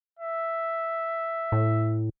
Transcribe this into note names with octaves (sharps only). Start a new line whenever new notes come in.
E5
A2